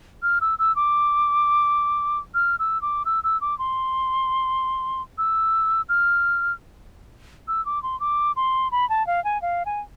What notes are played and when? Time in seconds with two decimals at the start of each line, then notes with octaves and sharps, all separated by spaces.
0.23 F6
0.41 E6
0.59 E6
0.76 D6
2.35 F6
2.59 E6
2.82 D6
3.05 E6
3.24 E6
3.41 D6
3.59 C6
5.18 E6
5.89 F6
7.48 E6
7.66 D6
7.83 C6
8.00 D6
8.36 C6
8.72 B5
8.90 A5
9.07 F5
9.24 G#5
9.42 F5
9.66 G#5